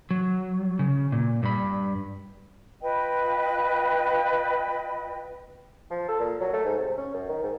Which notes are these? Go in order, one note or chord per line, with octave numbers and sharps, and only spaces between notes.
F#3
C#3
A#2
G2 B5
F4 B4 D#5 G5
F3
A4
A#2
F#3
A3
G#2
C3
C#4
F#2
D#3
G#2